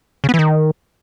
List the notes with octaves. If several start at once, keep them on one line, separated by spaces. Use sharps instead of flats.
C#3
B3
E3
D#3